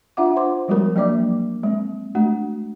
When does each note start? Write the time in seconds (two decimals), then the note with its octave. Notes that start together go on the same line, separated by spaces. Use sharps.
0.17 D4 F4 E5 F#5 D6
0.36 C5 C6 D6
0.68 F3 G3 G#3 B3 F#4 A#4
0.96 F#3 A#3 D4 D5 E5 D6
1.63 G#3 C4
2.15 G#3 A3 D4 F#4